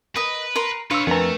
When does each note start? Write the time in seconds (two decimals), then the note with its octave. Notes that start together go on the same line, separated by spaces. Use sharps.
0.16 A#4 B4 D#5
0.55 A#4 A#5 C6
0.91 D4 B4 C#5 F5 C6 E6
1.07 F2 A3 A#4 B4 A#5